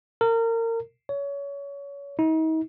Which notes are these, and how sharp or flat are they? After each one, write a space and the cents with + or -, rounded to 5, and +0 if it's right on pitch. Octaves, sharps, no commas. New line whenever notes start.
A#4 -30
C#5 +25
D#4 +40